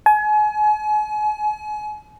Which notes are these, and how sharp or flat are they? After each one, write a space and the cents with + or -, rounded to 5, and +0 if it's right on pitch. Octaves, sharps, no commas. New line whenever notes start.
G#5 +35